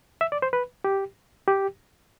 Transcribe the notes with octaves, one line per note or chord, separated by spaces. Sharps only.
E5
D5
C5
B4
G4
G4